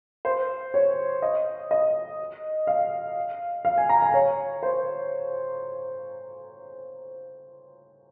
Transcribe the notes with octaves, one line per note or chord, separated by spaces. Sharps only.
C5
C#5
D#5
D#5
F5
F5
G#5
A#5
G#5
C#5
C5